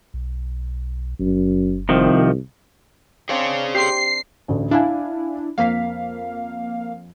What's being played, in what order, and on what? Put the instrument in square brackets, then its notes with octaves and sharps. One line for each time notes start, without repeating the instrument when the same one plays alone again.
[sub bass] B1
[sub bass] F#1 [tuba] F#2
[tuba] C2 [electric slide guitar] C3 D#3 F3
[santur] C4 D4 C5 [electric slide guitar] G#4 C#5 F5
[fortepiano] G4 C6 [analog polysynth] C7
[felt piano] A1 D2 D3
[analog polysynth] D4 E4 [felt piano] E5 F5 G#5
[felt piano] F2 B6 [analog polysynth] A#3 F5